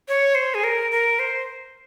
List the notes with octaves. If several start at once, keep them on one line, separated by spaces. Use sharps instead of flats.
C#5
C5
G#4
A#4
A#4
C5